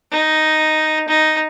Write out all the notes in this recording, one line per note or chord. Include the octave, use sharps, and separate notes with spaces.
D#4
D#4